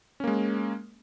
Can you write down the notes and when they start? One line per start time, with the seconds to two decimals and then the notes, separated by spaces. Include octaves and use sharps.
0.20 C#4
0.24 A#3
0.27 G#3